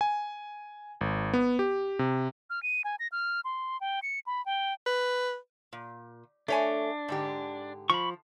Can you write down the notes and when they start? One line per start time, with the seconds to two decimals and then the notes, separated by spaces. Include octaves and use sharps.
0.01 G#5
1.01 G#1
1.33 B3
1.59 G4
1.99 C3
2.50 F6
2.63 D#7
2.84 G#5
2.99 A#6
3.12 F6
3.44 C6
3.81 G5
4.02 C#7
4.26 B5
4.46 G5
4.86 B4
5.73 A#2
6.48 A3 D4 C#5 G#5
7.08 G#2 D3 G4
7.90 F3 B5 C#6